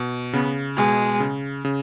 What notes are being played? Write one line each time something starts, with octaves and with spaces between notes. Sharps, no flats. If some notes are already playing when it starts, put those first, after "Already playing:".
Already playing: B2
C#3 B3
B2 G#3
C#3
C#3